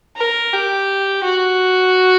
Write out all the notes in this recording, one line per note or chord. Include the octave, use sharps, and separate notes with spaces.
A#4
G4
F#4